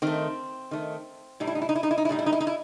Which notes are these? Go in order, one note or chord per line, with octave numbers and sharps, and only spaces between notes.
D#3 A3 C4
D#3 A3
A2 G3 D#4
E4
D#4
E4
D#4
E4
D#4
E4
D#4
E4
A2 G3 D#4
E4
D#4
E4
D#4
E4